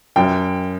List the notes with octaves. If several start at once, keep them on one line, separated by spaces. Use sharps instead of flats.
F#2 G5